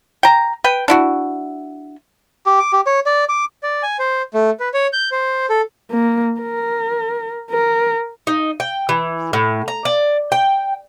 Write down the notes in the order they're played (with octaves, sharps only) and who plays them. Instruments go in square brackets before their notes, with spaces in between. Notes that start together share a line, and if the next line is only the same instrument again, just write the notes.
[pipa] G5 A#5
B4 G5
D4 E4 F#4
[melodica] G4
D6
G4
C#5
D5
D6
[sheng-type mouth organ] D5
G#5
C5
A3
B4
C#5
G6
C5
A4
[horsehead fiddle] A#3
A#4
A#4
[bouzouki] D#4
G5
E3
A2
A#5
D5
G5